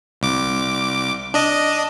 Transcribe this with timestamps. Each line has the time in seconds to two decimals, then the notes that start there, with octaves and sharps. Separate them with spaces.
0.21 C2 D6
1.34 D4 D#5